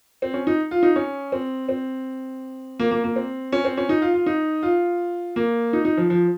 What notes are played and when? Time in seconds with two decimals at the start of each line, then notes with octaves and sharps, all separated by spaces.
0.22 C4
0.34 C#4
0.47 D#4
0.71 F4
0.83 D#4
0.96 C#4
1.32 C4
1.69 C4
2.79 A#3
2.91 A#3
3.04 A#3
3.16 C4
3.52 C#4
3.64 C4
3.77 C#4
3.89 D#4
4.02 F4
4.14 F4
4.26 D#4
4.63 F4
5.36 A#3
5.73 D#4
5.85 D#4
5.97 F3
6.10 F3